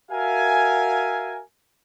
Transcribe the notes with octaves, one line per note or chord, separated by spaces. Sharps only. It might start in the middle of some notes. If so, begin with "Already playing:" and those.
F#4 A#4 E5 F5 G#5